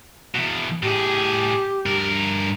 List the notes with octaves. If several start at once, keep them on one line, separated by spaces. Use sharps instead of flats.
E2 B2
A2 G4 G#4
G2 A#4